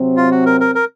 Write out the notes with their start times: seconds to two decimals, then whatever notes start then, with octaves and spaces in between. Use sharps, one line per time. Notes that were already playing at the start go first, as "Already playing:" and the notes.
Already playing: C3 F#3 C4
0.17 F4
0.31 F#4
0.46 A#4
0.61 A#4
0.75 A#4